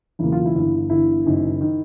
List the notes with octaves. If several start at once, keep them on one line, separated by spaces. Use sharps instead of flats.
E1 E2 C#3 F#3 A#3 E4
F4
E4
G1 G2 E3
G1 G2 E3 E4
F#1 F#2 D#3
D#3